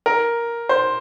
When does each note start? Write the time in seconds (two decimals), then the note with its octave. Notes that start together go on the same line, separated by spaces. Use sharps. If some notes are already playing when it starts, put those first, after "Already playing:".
0.06 A#4
0.69 C5